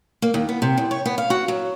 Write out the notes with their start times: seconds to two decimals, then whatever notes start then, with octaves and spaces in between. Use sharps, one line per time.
0.22 A#3
0.34 D#2
0.49 B3
0.62 C3
0.78 E2
0.91 C#5
1.06 B3
1.18 F5
1.30 F#4
1.48 F#3